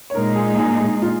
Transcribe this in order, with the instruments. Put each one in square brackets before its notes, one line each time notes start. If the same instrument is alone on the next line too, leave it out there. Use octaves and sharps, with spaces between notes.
[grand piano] C#5
[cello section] A#2 G#3 D#4 [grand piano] A#4
[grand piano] G#4
G#4
G#4
F4